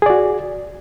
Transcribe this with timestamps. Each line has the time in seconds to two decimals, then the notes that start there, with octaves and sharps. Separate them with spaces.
0.02 G#4
0.06 D5
0.10 F#4